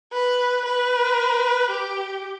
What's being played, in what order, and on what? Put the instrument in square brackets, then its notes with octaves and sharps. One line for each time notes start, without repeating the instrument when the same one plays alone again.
[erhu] B4
B4
G4